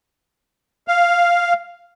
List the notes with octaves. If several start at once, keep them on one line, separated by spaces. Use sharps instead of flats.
F5